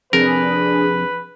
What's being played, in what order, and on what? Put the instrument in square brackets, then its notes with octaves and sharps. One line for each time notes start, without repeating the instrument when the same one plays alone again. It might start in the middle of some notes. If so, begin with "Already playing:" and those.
[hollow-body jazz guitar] F2 C3 [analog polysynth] D4 G#4 [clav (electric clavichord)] A#4 [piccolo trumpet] B4